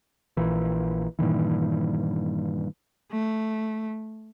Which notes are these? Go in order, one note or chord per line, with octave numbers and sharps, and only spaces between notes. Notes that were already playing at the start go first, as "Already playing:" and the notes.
A#1 A#2 E3
G2 A#2 D#3 E3
A3